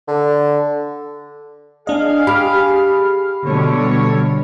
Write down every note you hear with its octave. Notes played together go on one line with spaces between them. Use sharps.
D3
D4 G#4 D#5 F5
G4 B5 F6
B2 D3 G3 A4 C#5